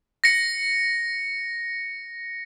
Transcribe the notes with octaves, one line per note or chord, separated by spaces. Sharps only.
A#6 C#7